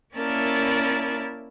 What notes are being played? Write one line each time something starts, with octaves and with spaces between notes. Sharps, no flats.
A#3 C#4 E4 A#4 D5 A5